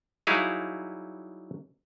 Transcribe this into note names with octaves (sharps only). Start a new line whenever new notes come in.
F#3 G3 D#4 E4 G#4 F5